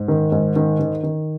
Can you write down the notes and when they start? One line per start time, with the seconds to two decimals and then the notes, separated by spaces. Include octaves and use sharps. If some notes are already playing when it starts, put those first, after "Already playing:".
Already playing: G#2
0.08 D#3
0.32 G#2
0.56 D#3
0.79 D#3
1.03 D#3